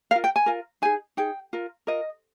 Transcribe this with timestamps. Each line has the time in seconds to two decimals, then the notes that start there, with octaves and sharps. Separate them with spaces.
0.11 F4 A#4 F5
0.24 G5
0.36 G#5
0.46 F4 A#4
0.82 D#4 G#4 G#5
1.17 D#4 G#4 G5
1.53 F4 A#4
1.87 F4 A#4 D#5